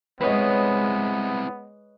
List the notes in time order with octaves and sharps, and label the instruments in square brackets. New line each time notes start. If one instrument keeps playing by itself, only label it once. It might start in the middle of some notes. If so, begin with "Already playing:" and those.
[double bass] G#3 [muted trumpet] B3 [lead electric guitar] C4 E4 [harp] B4 C#5 D#5